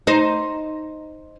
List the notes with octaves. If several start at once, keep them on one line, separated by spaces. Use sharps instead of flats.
D#4 C5